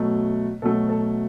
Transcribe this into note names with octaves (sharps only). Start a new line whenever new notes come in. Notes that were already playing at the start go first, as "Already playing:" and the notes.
Already playing: B2 F#3 A3
B2 F#3 A3 A4
A4